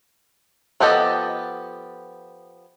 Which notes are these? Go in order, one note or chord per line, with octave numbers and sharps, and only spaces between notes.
F3 B3 G4 A4 D#5